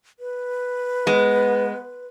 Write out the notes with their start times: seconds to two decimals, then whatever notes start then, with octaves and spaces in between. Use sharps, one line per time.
0.19 B4
1.07 G#3 B3